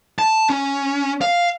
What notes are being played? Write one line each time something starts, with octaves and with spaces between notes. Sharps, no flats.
A5
C#4
F5